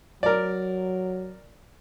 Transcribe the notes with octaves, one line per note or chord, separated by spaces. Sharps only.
F#3 A#4 D5